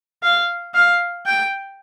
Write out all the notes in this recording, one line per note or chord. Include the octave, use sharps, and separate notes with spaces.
F5
F5
G5